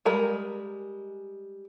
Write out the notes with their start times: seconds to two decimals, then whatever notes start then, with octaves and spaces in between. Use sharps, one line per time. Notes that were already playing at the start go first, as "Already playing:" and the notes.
0.05 G3 G#3 A#4